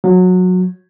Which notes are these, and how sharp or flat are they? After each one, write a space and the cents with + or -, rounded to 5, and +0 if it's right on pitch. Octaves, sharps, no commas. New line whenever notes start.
F#3 -20